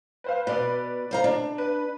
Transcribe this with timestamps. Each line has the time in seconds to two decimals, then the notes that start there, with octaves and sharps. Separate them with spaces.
0.24 B4 C5 F5
0.47 B2 B4 D5
1.11 C5 F5 A#5
1.24 D4
1.58 B4